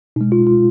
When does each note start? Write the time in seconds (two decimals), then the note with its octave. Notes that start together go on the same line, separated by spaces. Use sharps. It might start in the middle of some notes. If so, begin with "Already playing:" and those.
0.16 B2 D#4
0.21 G#3
0.32 F4
0.47 F4